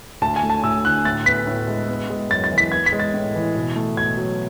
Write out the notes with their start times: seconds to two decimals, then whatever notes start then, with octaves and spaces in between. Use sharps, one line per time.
0.21 D2 A5
0.36 G#5
0.43 A3
0.50 A5
0.64 D2 E6
0.84 D3 F#6
1.05 A2 A6
1.26 B3 B6
1.47 A2
1.68 G#3
1.88 B3
2.10 G#3
2.30 F#2 A6
2.44 A6
2.52 E3
2.58 B6
2.72 B3 G#6
2.86 B6
2.92 G#3
3.00 A6
3.14 A2
3.35 E3
3.55 B2
3.76 A3
3.96 B2 G#6
4.17 F#3